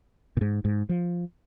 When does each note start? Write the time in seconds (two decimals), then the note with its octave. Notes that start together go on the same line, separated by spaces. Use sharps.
0.37 A#2
0.41 G#2
0.65 G#2
0.89 F3